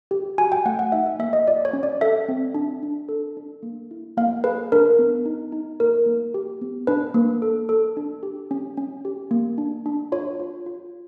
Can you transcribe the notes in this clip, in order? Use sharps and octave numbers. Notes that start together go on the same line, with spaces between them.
G4
F#4 G#5
G5
A3 F#5
F#5
D#4 E5
E5
A#3 E5
D#5
F4 D5
C#5
C#4
D5
A4 E5
C4
D4
D4
A4
D4
A#3
E4
A#3 F5
G#4 B4
D4 A#4
B3
D#4
D#4
A#3 A#4
A#3
G4
B3
D4 B4
A#3
A4
A4
D4
G4
C#4
C#4
G4
A#3
D4
D4
F4 C#5
F4
F4